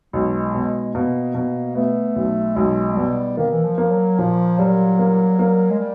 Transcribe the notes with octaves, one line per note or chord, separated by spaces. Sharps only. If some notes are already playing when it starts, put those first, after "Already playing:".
B1 G#3
B2
B2 A#3
B2
A3 B3
B1
B1 G#3
G#3
B2 G3
D#3 A#3
E3
F3
A#3
F#3
A#2 F3
F#3 G3
A#3
A#3
G#3
G3